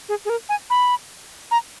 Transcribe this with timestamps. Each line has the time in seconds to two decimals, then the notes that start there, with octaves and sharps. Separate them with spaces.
0.09 G#4
0.25 G#4
0.30 A#4
0.49 G#5
0.70 B5
1.51 A#5